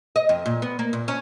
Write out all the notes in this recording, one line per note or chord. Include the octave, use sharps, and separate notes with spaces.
D#5
F2
A#2
B3
A#3
A#2
C#4